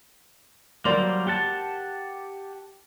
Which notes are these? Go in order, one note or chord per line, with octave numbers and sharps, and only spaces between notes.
F#3 G3 A#3 A#4 C5 D5
G4 F#5 A5